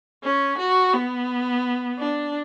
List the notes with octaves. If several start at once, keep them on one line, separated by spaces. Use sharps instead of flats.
C#4
F#4
B3
D4